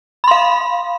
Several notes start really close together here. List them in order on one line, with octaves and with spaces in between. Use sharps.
B5 C6 F5